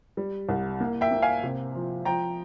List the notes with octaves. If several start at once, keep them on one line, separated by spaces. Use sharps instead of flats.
G3
C2
A#3
E5 G5
A#3
F5 G#5
C3
F3
F3 G5 A#5